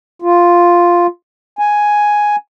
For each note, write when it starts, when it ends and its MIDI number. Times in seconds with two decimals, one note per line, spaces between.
0.22 1.07 65
1.59 2.36 80